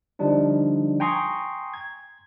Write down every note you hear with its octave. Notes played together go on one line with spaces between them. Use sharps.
D3 F3 G3 D4 D#4
G5 G#5 A#5 C6 C#6 D#6
G#6